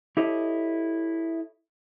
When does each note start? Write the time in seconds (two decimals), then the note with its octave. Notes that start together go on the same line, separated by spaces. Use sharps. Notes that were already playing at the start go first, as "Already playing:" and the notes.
0.17 E4 G4 A4 C#5 D#5